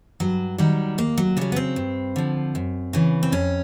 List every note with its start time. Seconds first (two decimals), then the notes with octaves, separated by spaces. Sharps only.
0.20 G2 F#3
0.58 D#3 F#3 G3
0.98 D#2 A#3
1.18 F#3
1.37 C#3 F#3 G3
1.52 B3
1.56 C4
1.76 G2
2.16 D3 F3
2.55 F#2
2.93 C#3 E3
3.23 C4
3.32 F2 C#4